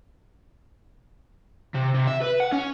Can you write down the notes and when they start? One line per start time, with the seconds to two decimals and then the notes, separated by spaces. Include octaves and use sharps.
1.74 C3
1.94 C3
2.07 E5
2.21 B4
2.40 F#5
2.52 C#4